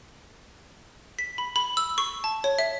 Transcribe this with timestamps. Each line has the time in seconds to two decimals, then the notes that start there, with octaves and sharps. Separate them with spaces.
1.19 B6
1.38 B5
1.56 B5
1.77 E6
1.98 C#6
2.24 A5
2.44 C#5
2.59 E5